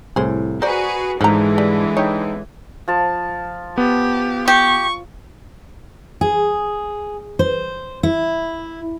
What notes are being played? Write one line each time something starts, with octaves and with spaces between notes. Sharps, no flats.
C2 A2 G#4 C5
F#4 G#4 B4 C5 D5 A#5
G#2 D3 E3 F3 G#3 A#5
G3
D#4 C#5 G5
F3 A5
B3 G4
G4 C#6
G#4
C5
E4